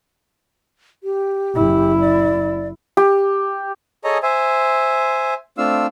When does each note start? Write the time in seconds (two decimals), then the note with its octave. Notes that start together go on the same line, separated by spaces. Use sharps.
1.04 G4
1.55 F#1 E4
2.00 D5
2.97 G4
4.04 G#4 A4 C#5 D#5 G#5 A#5
4.23 C5 E5 G#5
5.58 A3 C4 D4 F4 F5 E6